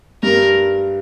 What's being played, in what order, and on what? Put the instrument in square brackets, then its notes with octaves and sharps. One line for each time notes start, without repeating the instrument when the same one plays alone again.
[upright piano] G2 [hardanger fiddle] A#4